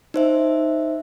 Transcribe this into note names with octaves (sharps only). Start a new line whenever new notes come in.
D#4 C5 E5